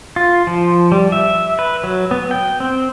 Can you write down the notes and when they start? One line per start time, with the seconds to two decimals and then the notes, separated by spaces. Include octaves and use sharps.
0.16 F4
0.47 F3
0.92 G3
1.12 E5
1.59 B4
1.84 F#3
2.11 B3
2.31 G5
2.60 C4